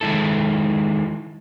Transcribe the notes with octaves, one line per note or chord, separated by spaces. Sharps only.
D#3 G#3 E4 A4